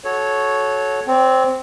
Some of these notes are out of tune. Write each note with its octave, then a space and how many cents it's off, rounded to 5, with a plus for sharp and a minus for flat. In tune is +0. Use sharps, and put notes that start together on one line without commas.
F#4 +0 A4 -25 C#5 +0
C4 +0 C#5 +40